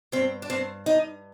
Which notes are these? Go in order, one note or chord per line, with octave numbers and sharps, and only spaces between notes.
G2 C4
D4
G2 C4
G2 D#4